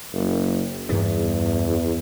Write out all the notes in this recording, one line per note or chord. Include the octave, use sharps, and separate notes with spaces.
F#1
E2 G2 B3